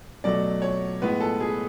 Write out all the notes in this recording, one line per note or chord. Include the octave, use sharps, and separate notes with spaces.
B2 F#3 A3 D5
C#5
A2 G#3 B3 B4
A4
G#4